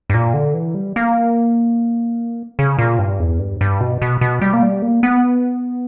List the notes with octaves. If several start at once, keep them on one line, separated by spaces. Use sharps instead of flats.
G2
A#2
D3
E3
G3
A#3
C#3
A#2
G2
E2
G2
G2
B2
B2
B2
G3
A#3
G3
A#3
B3